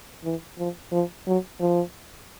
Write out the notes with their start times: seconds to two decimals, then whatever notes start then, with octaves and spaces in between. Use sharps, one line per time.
0.24 E3
0.58 F3
0.92 F3
1.27 F#3
1.61 F3